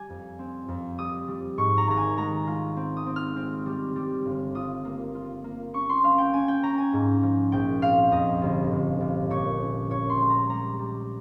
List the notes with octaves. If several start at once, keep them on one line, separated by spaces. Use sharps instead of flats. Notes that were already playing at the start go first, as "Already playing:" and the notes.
Already playing: G3 G#5
F2
C4
F2
G3 D#6
G3
G#2 C#6
A#5
G#1 A#5
G#5
G#3 A#5
F4
C4
D#6
C4
F6
C4
G3
G3
G1
F4 D#6
A#3
F4
A#3
C#4 C#6
C6
C#4 F5
G5
C#4 G#5
G5
C#4 A#5
G#5
G#2
F3
A#1 G5
C4 F5
F2 D#5
G1
G1
G1
A#2 C#5
C#4
A#2 C#5
C6
G#3
A#5
G3 A#5
G3